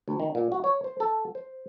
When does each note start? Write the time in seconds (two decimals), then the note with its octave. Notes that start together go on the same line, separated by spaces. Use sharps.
0.08 D2
0.20 D#3
0.35 A#2
0.52 F#4
0.64 C#5
0.84 C5
1.00 A4
1.35 C5